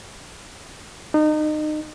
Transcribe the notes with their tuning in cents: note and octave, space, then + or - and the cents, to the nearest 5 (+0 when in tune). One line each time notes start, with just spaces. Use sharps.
D#4 -30